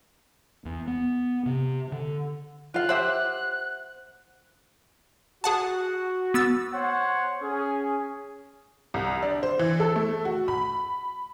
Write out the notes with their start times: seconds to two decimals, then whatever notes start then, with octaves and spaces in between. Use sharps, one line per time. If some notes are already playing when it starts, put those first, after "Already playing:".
0.65 E2
0.87 B3
1.46 C3
1.92 D3
2.74 F4 F5 F#6
2.89 G4 C5 E5 F#5
5.44 F#4 G#4 F#5 A5
6.34 B3 E6 A6
6.73 C5 C#5 F#5
7.42 C#4 G#4
8.94 C2
9.23 D4
9.43 C5
9.59 E3
9.80 A4
9.96 A3
10.25 F#4
10.48 B5